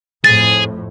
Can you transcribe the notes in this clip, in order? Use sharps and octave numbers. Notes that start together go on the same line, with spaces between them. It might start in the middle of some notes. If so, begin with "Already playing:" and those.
F2 A2 G#4 A6